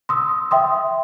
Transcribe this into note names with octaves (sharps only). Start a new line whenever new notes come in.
C6 D#6 E6
E5 G5 C6 D#6